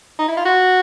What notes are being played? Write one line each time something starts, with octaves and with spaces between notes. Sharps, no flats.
D#4
E4
F4
F#4